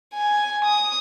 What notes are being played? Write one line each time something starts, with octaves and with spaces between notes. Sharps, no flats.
G#5
D#6